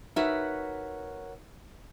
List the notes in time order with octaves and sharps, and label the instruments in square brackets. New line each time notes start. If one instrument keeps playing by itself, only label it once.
[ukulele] D#4 [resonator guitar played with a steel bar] F#4 B4 E5 [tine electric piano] A#4 C#5 F#5